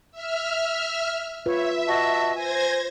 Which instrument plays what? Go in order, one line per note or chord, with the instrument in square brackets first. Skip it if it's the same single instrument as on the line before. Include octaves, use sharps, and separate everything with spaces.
[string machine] E5 F6
[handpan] F4 B4 [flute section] C#5 [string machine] E5
[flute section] F#4 D#5 A5
[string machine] C5 G#6 A#6 [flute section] G#5